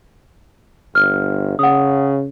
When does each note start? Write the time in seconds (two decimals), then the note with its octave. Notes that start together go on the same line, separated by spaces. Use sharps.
0.95 G1 F6
1.59 C#3 F#5 D#6